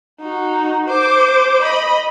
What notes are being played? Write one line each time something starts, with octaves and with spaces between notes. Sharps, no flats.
D#4 F#4
C5 D6
D#5 B5